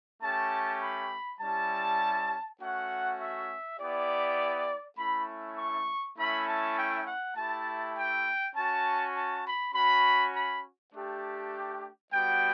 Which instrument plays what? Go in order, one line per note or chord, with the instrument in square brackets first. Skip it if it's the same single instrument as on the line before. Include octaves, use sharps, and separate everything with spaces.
[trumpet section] A3 C#4 G4 A5
B5
G3 C#4 E4 G4 A5
A3 C#4 F#4 F#5
E5
B3 E4 G4 D5
A3 C#4 E4 B5
C#6
A3 C#4 E4 B5
A5
G5
F#5
A3 E4 G4 A5
G5
C#4 F#4 A5
A5
B5
C#4 F#4 B5
B5
A3 D4 G4
G3 B3 F#4 G5